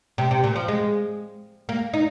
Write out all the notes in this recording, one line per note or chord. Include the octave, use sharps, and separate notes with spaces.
C3
C3
A#2
F3
G#3
A#3
D#4